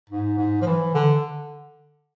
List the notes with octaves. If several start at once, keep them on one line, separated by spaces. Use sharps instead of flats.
G#2
G#2
F3
E3
D3